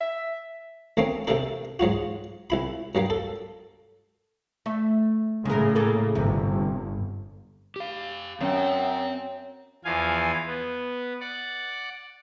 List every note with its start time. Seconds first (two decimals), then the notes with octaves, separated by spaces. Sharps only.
0.01 E5
0.97 D2 A3 A#3 C4 C#4
1.27 C3 A3 A#3 D4 A4
1.79 G#2 F#3 F4 F#4
2.50 C2 E4 B5
2.95 G2 F#3 G3 A#3
3.10 A4
4.66 A3 E5
5.45 A2 C#3 G#3 A#4
5.75 A#3 G#4 A4
6.15 G1 G#2 C3
7.76 G4 F5
8.41 F#2 C4 G5
9.84 E2 F3 F5 G#5
10.47 B3
11.20 D5 F#5